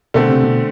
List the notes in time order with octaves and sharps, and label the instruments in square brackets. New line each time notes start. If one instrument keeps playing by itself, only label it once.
[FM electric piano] B2 [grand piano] D3 A3 C4
[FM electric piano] C3
B2